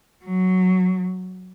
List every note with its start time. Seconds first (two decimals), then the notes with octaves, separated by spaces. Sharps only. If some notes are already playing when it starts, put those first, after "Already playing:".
0.24 F#3